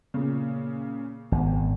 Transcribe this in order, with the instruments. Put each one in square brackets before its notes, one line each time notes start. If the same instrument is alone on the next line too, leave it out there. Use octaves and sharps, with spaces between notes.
[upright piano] A#2 C#3
[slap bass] G#1 [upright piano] E2